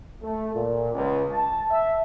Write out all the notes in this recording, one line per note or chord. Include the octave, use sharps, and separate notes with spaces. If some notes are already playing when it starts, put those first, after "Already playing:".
A3
A#2
C#2
A5
E5